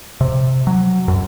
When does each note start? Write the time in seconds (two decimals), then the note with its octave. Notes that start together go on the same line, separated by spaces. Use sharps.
0.21 C3
0.67 F#3
1.08 F#2